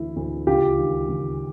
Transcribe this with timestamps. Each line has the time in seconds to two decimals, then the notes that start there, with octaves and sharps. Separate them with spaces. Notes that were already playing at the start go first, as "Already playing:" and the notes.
Already playing: D2 E3 E4
0.16 D2
0.47 C#2 F4 G4
0.78 D#3
1.09 C#2